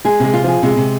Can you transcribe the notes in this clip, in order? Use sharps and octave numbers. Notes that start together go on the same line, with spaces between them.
G#3 G#4
C3 G#3
F4
F3 G#4
C3 G#3
C3